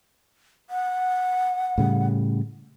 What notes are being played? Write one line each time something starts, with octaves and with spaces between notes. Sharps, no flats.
F#5
A2 C#3 G3